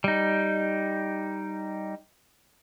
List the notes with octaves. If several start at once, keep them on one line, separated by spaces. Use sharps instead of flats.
G3 D#4